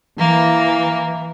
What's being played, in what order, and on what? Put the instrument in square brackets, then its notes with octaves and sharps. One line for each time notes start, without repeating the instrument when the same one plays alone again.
[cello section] E3 [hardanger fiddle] A#3